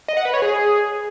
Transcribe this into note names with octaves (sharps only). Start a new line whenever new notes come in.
D#5
F#5
B4
C#5
G#4